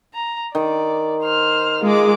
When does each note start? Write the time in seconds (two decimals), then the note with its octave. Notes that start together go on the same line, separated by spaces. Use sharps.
0.14 A#5
0.55 D#3 D5
1.24 C5 F6
1.83 G#3 F4 D6